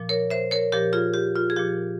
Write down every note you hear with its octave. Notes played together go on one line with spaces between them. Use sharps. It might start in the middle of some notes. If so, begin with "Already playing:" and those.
Already playing: A#2 F3
A#4 C#5
C5 E5
A#4 C#5
A#2 F3 G4 A#4
F4 G#4
G4
F4
G#4
A#2 F3 G4